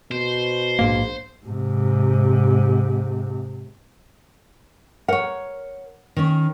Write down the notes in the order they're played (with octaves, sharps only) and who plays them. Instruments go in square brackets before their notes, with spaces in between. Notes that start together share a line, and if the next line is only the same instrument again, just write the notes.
[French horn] B2 [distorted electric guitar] C5
[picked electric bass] A#1 G#2 A#3
[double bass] G#2 C3
[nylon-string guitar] A#4 C#5 [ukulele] F#5
[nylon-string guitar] D#3 C#4